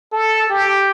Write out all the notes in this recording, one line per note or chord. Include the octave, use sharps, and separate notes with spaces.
A4
G4